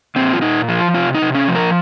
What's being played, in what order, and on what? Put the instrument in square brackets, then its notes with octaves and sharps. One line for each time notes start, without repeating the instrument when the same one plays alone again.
[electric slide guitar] A#2 C4
F4
A#2 D#4
F3 F4
C3 F4
D#4
C3
C#4
F3
A#4